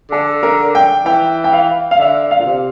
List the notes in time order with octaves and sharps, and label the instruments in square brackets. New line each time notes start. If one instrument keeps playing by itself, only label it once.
[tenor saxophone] D3 [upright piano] A4
[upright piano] A#4
G5
[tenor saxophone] E3 [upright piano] G5
[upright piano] G5
F5
F5
[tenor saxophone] D3 [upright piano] E5
[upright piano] F5
[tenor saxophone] A#2
C3